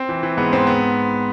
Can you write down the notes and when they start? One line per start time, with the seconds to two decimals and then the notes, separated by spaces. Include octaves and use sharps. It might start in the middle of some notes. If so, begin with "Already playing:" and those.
Already playing: C4
0.09 E3
0.23 E3
0.37 G#2 B3
0.53 G#2 C4
0.67 B3